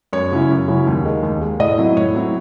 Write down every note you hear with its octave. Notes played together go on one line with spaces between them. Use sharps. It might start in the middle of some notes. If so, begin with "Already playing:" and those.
F#2 C#5
C#3 F#3 C#4 E4
F#2
C#3 F#3 C#4 E4
D#2
D#3 G#3
D#2
D#3 G#3
A2 D#5
F#3 C4 E4
A2 C#5
F#3 C4 E4